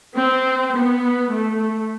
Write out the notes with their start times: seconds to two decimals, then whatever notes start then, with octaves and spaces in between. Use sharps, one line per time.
0.15 C4
0.74 B3
1.33 A3